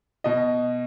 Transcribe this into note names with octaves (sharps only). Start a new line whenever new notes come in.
B2 D#5